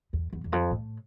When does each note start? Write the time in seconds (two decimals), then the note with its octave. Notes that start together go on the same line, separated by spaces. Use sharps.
0.13 E2
0.33 E2
0.44 E2
0.52 F2
0.71 A2